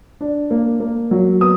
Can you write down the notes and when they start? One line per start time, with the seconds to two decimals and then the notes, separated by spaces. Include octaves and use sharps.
0.21 D4
0.51 A#3
0.80 A#3
1.11 F#3
1.41 B3 D#6